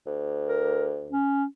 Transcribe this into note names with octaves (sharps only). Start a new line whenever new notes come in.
D2
A#4
C#4